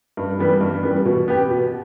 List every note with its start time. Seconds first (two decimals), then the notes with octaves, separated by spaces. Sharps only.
0.17 G2
0.39 E3 G3 B3
0.61 G2
0.83 E3 G3 B3
1.05 B2
1.28 B3 G4
1.50 B2